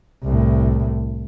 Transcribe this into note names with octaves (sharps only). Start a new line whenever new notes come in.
C2 A2